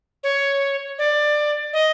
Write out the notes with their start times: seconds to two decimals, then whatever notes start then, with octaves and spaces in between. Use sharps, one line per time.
0.23 C#5
0.99 D5
1.73 D#5